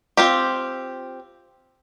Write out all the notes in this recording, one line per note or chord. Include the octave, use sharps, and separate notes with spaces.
C4 F4 G4